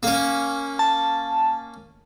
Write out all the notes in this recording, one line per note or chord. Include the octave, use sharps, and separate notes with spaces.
A#3 C#4
A5